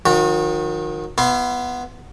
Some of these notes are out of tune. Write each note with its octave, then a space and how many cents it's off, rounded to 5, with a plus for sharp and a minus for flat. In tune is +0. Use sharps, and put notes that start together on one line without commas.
D#3 +0 F#3 -40 F#4 -40
B3 +0 E4 +45 C6 +0